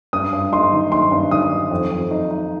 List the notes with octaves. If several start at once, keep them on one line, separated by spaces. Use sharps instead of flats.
G2 D#6
G2
D#4 C6
D#3
D#3 C6
G2
D#3 D#6
D#3
F2
F2
D#4
D#4